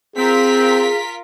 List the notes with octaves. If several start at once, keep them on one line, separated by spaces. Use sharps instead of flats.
C4 F4 G#4 A#4 B6